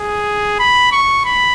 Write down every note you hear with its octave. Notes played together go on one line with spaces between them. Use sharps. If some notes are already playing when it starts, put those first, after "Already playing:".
Already playing: G#4
B5
C#6
B5